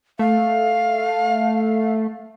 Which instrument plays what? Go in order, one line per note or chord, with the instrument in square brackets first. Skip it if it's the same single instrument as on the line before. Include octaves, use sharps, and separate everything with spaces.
[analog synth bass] A3 [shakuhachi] F5